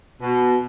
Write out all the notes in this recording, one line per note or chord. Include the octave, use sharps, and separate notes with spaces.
B2